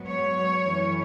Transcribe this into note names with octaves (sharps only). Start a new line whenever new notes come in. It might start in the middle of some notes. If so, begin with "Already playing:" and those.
Already playing: G#2 F#3 B3
C#5
F#2 E3 A3 C#4